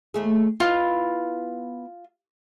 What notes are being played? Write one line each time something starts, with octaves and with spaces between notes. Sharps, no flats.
D#2 A3 G#4
B3 E4 F4 D#5